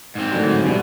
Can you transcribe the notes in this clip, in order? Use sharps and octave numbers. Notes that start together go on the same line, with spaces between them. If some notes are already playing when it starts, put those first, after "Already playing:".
G#2 C4
A2 D3 F#3
G2 B2 G#3